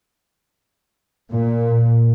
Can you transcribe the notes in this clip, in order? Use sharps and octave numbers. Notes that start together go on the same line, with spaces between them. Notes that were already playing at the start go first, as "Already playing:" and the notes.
A#2